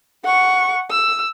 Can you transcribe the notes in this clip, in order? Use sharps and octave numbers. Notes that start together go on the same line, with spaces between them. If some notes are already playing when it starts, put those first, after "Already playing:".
F#5 C#6
E6